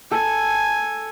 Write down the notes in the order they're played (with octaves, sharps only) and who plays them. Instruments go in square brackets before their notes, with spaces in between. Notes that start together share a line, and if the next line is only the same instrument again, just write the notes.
[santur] A4 [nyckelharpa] G#5